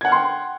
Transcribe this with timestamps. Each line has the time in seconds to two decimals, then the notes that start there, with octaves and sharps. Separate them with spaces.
0.01 G#6
0.05 F#5
0.08 F6
0.12 C6
0.16 G5